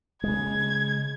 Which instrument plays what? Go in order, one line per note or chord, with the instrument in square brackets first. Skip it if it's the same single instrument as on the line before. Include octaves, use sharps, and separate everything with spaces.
[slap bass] C#3 G#3 [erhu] G#6